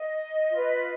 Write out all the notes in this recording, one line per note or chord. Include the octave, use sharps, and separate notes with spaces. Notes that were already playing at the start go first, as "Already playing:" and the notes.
Already playing: D#5
F4 B4